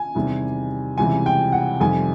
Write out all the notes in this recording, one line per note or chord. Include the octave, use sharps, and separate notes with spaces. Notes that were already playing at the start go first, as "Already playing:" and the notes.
Already playing: G#5
E2 C3 D#3 G3
C#2 C3 E3 G3 G#5
G5
F#5
F2 C3 D#3 G3 G#5